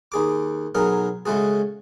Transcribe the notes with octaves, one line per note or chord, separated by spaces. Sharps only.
D#2 G#4 D6
B1 F#3 G#4 A#4
C#3 G#3 A3 F#4 G#4